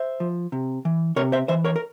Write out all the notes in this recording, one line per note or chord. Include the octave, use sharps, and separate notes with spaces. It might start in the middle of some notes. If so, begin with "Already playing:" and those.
Already playing: C5 E5
F3
C3
E3
C3 A#4 C#5
C5 E5
E3 C5 E5
A#4 C#5
A#4